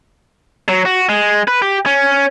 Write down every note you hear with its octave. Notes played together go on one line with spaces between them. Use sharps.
F#3
F#4
G#3
B4
G4
C#4